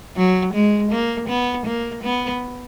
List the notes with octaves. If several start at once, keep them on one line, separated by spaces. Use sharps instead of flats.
F#3
G#3
A#3
B3
A#3
B3